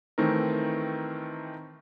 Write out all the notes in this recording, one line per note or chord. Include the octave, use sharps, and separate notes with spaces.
D#3 E3 A3 C4 D#4 A#4